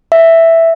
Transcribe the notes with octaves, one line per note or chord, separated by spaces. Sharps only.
E5